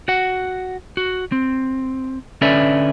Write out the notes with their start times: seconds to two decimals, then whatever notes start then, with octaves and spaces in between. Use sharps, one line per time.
0.08 F#4 F#5
0.97 F#4
1.32 C4
2.41 D3 C#4 A4 B4 D5 E5